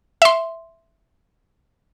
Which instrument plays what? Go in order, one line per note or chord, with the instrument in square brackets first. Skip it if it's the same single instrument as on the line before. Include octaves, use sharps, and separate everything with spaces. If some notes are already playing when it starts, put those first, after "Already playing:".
[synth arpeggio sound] E5 C6